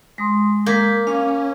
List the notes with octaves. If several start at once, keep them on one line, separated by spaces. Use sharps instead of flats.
G#3 C6 D#6 A#6
A#3 G6 G#6 B6
C#4 F5 D6